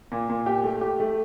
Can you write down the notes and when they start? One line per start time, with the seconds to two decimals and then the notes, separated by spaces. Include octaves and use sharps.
0.12 A#2
0.30 A#2
0.46 G4
0.64 A3
0.81 G4
1.00 A3